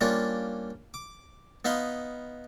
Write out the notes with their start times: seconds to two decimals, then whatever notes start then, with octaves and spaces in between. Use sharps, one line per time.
0.01 G3 A#3 C#4 D4 F4
0.94 D6
1.65 B3 D#4 F5 B5 C6